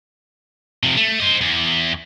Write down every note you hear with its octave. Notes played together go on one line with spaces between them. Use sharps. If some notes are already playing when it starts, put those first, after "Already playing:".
C3 F3
A3
C5 D#5
E2